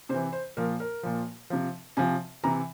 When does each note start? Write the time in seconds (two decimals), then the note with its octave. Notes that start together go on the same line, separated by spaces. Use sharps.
0.09 C3 C5
0.14 E3
0.33 C5
0.57 A#2 F3 A#4
0.80 A#4
1.03 A#2 F3
1.50 C3 F3
1.97 C3 F3 G#5
2.44 C3 E3 A#5